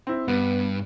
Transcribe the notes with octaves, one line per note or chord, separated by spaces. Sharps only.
C4 E4
G2 B3